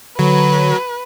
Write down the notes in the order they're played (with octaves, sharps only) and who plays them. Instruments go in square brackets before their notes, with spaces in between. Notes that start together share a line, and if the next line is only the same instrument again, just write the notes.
[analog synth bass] D3 [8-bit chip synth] F#3 [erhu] B4